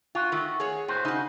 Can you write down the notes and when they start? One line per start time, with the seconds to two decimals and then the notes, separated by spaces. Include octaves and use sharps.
0.15 F4 F#4
0.32 D#3 A3
0.60 G#4 C#5
0.88 A2 F#4 C5
1.05 C#3 D#4 F#4